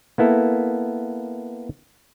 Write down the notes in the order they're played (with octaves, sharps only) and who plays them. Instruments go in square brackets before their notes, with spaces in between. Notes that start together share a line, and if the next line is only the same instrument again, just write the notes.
[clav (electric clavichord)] A#3 B3 E4 A4